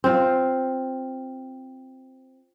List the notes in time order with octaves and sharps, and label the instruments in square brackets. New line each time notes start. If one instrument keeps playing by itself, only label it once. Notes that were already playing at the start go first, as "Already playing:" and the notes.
[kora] C4 F4